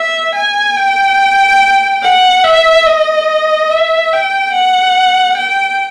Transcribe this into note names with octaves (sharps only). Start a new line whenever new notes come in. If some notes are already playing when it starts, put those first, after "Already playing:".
Already playing: E5
G#5
G5
F#5
E5
D#5
E5
G5
F#5
G5